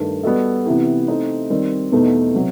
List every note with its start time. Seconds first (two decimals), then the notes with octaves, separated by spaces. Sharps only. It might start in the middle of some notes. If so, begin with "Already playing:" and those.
Already playing: G2 D#3 A3
0.23 G3 B3 F#4 A4 D#5
0.66 C3 E3 B3 E4 G4
1.08 A3 C4 D#4
1.50 D#3 G3 C4
1.92 E2 B2 A3 D#4
2.34 C3 F#3